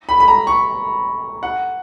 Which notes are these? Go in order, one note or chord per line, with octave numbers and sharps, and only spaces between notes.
B5
B5
A#5
C#6
F#5